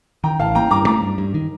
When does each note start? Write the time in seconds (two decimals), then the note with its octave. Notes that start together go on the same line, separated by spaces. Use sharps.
0.24 D#3 G5 A#5
0.39 A1 F5 A5
0.55 A#3 G5 A#5
0.71 G2 A#5 D6
0.86 A3 A#5 D6
1.03 G2
1.18 G2
1.34 D#3